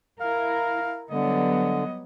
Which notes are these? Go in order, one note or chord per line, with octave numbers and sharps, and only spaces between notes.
E4 A#4 F5
D3 F#3 G3 B3 D#5